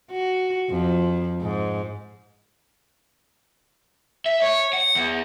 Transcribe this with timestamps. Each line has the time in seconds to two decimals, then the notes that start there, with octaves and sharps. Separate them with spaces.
0.11 F#4
0.71 F2
1.41 G#2
4.26 E5
4.42 C#5
4.73 F#5
4.95 E2